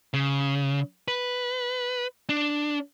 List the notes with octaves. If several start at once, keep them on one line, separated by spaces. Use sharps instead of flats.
C#3
B4
D4